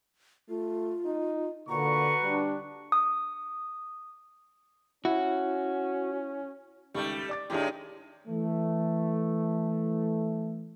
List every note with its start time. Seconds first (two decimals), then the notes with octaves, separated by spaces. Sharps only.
0.49 A3 F4
1.05 D#4
1.69 A#2 D3 F#4 B4 A#5 C#6
2.23 G3 D4
2.92 D#6
5.05 C#4 E4 F#4
6.94 C#2 D#3 G3 A3 C#6
7.29 D5 D6 A6
7.50 A2 D#3 G#3 D4 E4 G4
8.28 E3 A3